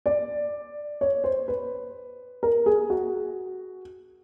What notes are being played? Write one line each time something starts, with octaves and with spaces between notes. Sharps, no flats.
D5
C#5
C5
B4
A#4
G#4
F#4